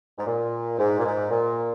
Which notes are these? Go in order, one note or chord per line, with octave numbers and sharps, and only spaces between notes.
G#2
A#2
G#2
A#2
G#2
A#2